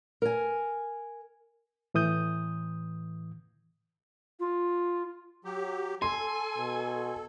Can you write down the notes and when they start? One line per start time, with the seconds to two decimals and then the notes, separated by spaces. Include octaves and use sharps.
0.22 A#4 G#5
1.94 A2 E3 D#6 G6
4.40 F4
5.45 F#3 G4
6.02 A4 G#5 C6
6.58 B2